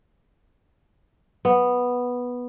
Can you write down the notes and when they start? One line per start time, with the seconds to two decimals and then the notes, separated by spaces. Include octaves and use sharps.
1.45 B3